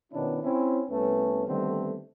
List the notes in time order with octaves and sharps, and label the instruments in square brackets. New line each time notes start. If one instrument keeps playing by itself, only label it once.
[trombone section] B2 D#3 C#4 D4 E4
C4 C#4 E4
C2 A3 B3 C#4
D3 D#3 G3 A3 B3 C4